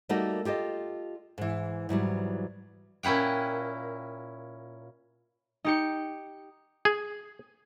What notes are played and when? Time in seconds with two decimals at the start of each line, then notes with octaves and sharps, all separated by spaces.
0.09 G3 A3 A#3 D#4 F#4 A#4
0.45 F4 G4 A4 D#5
1.38 G#2 E3
1.89 G#2 E3 F#3 G3
3.03 A#2 C#4 E4 F#5 G5
5.64 D#4 G4 C#7
6.85 G#4